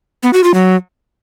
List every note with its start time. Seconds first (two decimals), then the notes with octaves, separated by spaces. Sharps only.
0.23 B3
0.33 F#4
0.44 F4
0.54 F#3